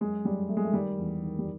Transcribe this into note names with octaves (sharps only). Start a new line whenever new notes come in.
F#2 G#3
F#2 G3
F#2 A3
G#3
A3
D#3 G3
E2
D#3
G3